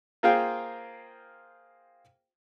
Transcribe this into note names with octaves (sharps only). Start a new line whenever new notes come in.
A#3 F4 G#4 C5 F5 G5